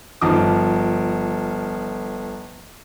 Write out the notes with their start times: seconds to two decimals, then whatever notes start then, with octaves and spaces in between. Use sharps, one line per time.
0.21 G1 F3 D#4 D6